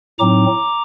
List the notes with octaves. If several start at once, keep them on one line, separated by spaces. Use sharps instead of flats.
A2 F#3 C4 D#4 A#5 D6